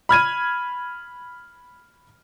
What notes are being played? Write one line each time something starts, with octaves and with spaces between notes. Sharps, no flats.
B5 F6 G#6 D#7